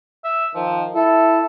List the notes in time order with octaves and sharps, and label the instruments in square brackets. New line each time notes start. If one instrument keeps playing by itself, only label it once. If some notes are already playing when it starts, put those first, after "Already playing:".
[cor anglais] E5
[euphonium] D#3 [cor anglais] F3
[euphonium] E4 [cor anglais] A4